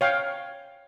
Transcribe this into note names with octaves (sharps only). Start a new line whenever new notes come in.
C#5 F5 G5